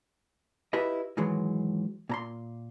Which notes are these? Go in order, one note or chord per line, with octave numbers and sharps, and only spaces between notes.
E4 F4 G4 B4 D#5
G#2 D#3 E3 F#3 G#3
A#2 A#5 C6